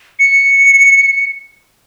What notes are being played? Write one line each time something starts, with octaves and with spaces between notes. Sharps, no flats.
C#7